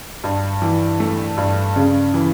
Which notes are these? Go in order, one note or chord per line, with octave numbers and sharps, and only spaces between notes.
G2
E3
A3
G2
C#3
E3